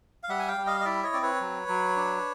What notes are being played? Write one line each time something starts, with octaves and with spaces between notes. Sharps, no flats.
F5
G3 E5 F#5
G#5
F5 G5
G3
D#5 F5
D#5
E4 D5 E5
C#5 D#5
C4 D5
B4 C#5
F#3
F#3
D4